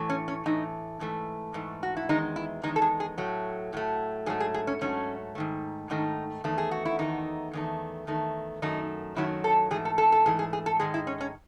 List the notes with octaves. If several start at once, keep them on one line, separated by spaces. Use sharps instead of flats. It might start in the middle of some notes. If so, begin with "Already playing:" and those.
Already playing: A2 E3 A3
C#4
C#4
A2 E3 A3 D#4
G#2 E3 A3
G#2 E3 A3
F#4
E4
E2 D#3 G#3 D#4
E4
E2 D#3 G#3 D#4
A4
G#4
G#4
A2 F#3 A3
A2 F#3 A3
G#2 F#3 A3 G#4
G#4
G#4
C#4
G#2 F#3 A3 C#4
G#2 D#3 A3
G#2 D#3 A3 D#4
E2 D#3 A3
G#4
F#4
E4
E2 D#3 A3 D#4
E2 D#3 A3
E2 D#3 A3
F#2 D#3 F#3 A3 D#4
F#2 D#3 F#3 A3 E4
A4
G#2 E3 A3 G#4
A4
A4
A4
G#2 E3 A3 G#4
G#4
G#4
A4
G#2 D#3 G#3 G#4
E4
C#4
C#4